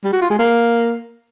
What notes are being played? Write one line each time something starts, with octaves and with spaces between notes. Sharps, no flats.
G3
F#4
F4
G#3
A#3